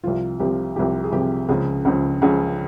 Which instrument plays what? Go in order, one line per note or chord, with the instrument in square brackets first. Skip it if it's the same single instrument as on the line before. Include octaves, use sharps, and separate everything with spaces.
[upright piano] C2 C3 F3 F4
C2 C3 F3 G4
C2 C3 F3 G4
G#4
C2 C3 F3 G4
C#2 C#3 F3 G#4
C#2 C#3 F3
C#2 C#3 F3 G#4